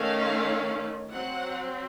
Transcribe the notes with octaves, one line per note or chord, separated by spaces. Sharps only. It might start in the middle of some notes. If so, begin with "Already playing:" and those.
Already playing: D#3 A3 C#4 F5
F#3 C4 F#5